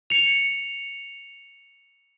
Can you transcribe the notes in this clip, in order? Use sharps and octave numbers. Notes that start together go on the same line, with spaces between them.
C#7 F7